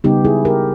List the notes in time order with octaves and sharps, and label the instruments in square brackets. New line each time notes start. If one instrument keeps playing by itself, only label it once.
[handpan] C#3 G3 B3 D#4 G4
E4 G#4
G4 A#4